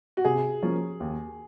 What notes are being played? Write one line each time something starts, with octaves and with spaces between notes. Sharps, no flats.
F#4
C3 G#4
F3 A#3 C#4
D#2